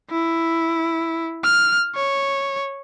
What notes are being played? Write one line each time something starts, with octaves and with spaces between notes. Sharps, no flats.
E4
F6
C#5